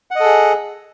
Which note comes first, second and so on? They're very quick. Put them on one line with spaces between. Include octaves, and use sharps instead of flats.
F#5 D#5 A4 G#4